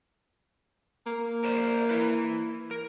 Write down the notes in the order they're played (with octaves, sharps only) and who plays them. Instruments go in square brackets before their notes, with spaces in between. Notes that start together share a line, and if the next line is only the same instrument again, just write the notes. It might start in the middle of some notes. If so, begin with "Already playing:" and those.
[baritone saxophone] A#3
[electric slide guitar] A#4 C5 D5
E4 B4
A#4